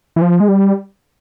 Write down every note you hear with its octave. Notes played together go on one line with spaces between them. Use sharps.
E3
F3
G#3
G3